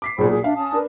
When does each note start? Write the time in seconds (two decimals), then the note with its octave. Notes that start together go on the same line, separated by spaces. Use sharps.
0.02 D6 B6 C7
0.18 B1 A#2 G#4 C5 B5
0.30 G#4
0.44 D4 E5 F5
0.56 C#4 A5 D#6
0.72 D4 A#4 B4